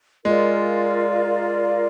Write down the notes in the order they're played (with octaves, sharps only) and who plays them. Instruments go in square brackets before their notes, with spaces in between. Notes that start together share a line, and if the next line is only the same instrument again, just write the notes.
[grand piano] G#3 [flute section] F4 A#4 D5 F5